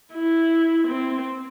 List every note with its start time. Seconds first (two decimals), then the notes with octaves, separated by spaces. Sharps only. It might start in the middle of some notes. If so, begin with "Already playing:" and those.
0.14 E4
0.88 C4